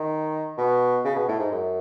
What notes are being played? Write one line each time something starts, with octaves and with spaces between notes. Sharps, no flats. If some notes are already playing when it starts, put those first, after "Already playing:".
Already playing: D#3
B2
C#3
B2
A2
G#2
F#2